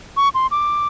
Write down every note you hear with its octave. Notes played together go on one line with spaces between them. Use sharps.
C#6
C6
D6